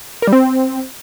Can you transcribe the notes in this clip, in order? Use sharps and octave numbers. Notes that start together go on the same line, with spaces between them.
A#4
G3
C4